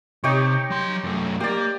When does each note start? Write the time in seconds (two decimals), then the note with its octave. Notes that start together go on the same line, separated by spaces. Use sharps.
0.24 C3 D#4 G4 C#5
0.70 F#3 C6
1.04 F#2 A3
1.40 A#3 G4 D5